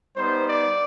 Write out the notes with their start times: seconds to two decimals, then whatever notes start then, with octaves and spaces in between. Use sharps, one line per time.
0.16 G3 B3 D#4 C5
0.47 D5